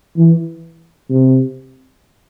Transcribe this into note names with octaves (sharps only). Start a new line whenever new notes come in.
E3
C3